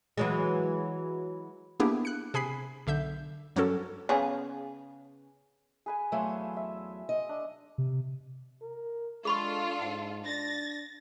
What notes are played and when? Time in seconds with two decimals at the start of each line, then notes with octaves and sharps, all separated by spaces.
0.17 E3 F#3 G#3
1.80 A#3 B3 D4 E4 G4 G#4
2.05 F#6 C#7
2.34 C3 G#4 G#5 B5 B6 C7
2.87 B1 D3 E5 G6
3.56 G2 F#3 G3 C#4 F#4 A4
4.09 C#3 B3 G#4
5.86 G#4 B4 G#5
6.12 E2 F#3 A3 E5 F5 C6
6.57 E5
7.09 D#5
7.29 D4
7.78 C3
8.62 A#4
9.25 G#3 D4 F4 G#4 A4 B5 C#6
9.82 G#2 F#5
10.25 D4 A6 A#6